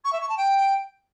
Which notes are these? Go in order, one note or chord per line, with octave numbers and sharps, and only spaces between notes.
C#6
E5
C#6
A5
G5